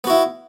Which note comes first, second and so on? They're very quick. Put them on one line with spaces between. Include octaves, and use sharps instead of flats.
B3 F#4 E4